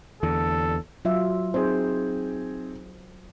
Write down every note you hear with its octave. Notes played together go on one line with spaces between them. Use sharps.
E2 D3 A4
F#3 F4 E5
C4 D#4 G#4 C5